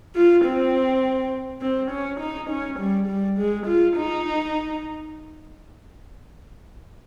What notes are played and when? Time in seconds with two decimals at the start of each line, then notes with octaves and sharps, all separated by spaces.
0.16 F4
0.46 C4
1.61 C4
1.91 C#4
2.20 D#4
2.50 C#4
2.79 G3
3.08 G3
3.38 G#3
3.67 F4
3.96 D#4